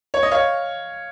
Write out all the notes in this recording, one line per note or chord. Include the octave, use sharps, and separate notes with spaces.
C#5
D#5
C#5 F5